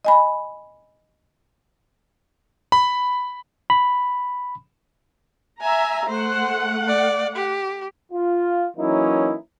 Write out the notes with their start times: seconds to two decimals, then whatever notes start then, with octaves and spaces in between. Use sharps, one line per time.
0.05 D#5 G#5 B5
2.72 B5
3.70 B5
5.61 E5 G#5 A#5
6.09 A3 C5 F#5
6.87 D5
7.36 G4
8.12 F4
8.77 E3 F#3 A#3 C#4 D#4 E4